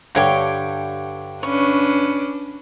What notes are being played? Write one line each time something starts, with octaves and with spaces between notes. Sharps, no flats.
G2 D3 G4 C#5 D6
C#4 D4 B4 C#6